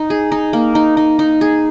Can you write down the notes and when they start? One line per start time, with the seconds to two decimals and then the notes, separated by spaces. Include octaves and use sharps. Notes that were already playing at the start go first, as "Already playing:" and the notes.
Already playing: D#4
0.10 G#4
0.32 D#4
0.53 A#3
0.75 D#4
0.97 D#4
1.19 D#4
1.41 G#4